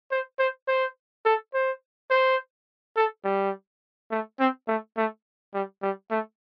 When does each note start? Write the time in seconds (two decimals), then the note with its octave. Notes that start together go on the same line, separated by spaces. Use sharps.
0.11 C5
0.39 C5
0.68 C5
1.25 A4
1.54 C5
2.10 C5
2.96 A4
3.25 G3
4.11 A3
4.40 C4
4.68 A3
4.97 A3
5.54 G3
5.82 G3
6.11 A3